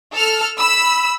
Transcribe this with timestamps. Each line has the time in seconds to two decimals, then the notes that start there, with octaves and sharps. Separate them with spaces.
0.13 A4 F6
0.59 B5 E6